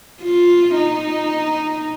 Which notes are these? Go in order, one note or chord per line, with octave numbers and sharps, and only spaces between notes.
F4
D#4